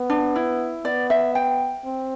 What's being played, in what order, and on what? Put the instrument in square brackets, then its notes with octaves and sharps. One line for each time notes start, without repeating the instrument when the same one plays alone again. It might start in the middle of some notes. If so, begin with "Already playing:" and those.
Already playing: [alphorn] B3
[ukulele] D4
E4
[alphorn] B3 [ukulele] D5
[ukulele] E5
G5
[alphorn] C4